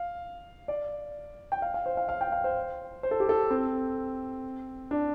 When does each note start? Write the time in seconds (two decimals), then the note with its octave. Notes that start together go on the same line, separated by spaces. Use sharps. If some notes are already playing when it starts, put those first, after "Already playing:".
Already playing: F5
0.68 D5
1.52 G5
1.62 F5
1.74 F5
1.86 C5
1.97 F5
2.09 F5
2.21 G5
2.32 F5
2.44 C5
3.03 C5
3.11 A4
3.20 G4
3.29 A4
3.51 C4
4.91 D4